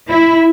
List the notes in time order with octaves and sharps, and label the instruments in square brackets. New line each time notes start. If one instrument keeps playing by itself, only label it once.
[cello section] E4